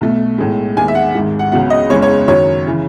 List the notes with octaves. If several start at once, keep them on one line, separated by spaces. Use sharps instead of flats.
B1 B2 A3
B1 A2 G#3
D#2 D#3 G#3 B3 G#5
E5
F#5
G#1 G#2 D#3 G#3
F#5
C#2 C#3 F#3 B3 F#5
D#5
F#1 E2 C#3 G#3 B3 C#5
C#5
F#2 D#3 F#3 C#5
C#3 E3